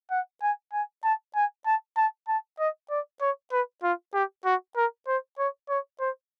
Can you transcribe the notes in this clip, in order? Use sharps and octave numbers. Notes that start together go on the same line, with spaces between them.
F#5
G#5
G#5
A5
G#5
A5
A5
A5
D#5
D5
C#5
B4
F4
G4
F#4
A#4
C5
C#5
C#5
C5